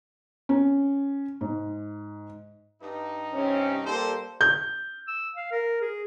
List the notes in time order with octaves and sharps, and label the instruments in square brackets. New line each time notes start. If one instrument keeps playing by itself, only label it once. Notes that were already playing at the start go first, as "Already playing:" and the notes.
[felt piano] C#4
G#2
[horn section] G2 D#4
[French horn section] C3 C4 C#4
[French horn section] G3 A#3 [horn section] A4 C5
[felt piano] G6
[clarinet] E6
F5
A#4
G#4